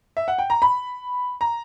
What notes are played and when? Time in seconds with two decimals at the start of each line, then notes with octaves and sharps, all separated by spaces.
0.17 E5
0.28 F#5
0.38 G5
0.50 A#5
0.62 B5
1.41 A#5